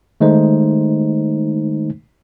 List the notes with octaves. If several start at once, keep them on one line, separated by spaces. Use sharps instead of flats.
D#3 G#3 A3 D#4 C5